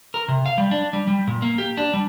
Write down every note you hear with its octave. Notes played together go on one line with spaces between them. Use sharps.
A#4
C3
F5
G3
D4
G3
G3
A#2
A#3
G4
D4
G3